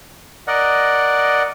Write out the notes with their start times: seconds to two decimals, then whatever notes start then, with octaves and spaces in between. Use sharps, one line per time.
0.47 A#4 D5 D#5 F#5